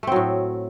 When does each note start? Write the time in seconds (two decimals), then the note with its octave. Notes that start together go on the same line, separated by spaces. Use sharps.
0.03 A3
0.07 C4
0.12 F#3
0.16 A2